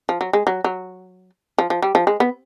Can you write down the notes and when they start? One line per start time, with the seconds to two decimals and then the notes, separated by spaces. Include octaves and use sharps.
0.09 F3
0.21 F#3
0.33 G#3
0.47 F#3
0.64 F#3
1.58 F3
1.70 F3
1.82 G3
1.95 F3
2.07 G#3
2.20 B3